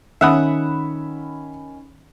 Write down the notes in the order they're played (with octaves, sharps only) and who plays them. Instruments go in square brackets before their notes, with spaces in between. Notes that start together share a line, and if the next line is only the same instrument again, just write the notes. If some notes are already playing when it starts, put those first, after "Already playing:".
[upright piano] D#3 C#4 B5 [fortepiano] E5 F#5 D#6